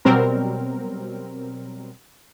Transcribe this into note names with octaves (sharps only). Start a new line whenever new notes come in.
B2 F#3 G3 C4 A#4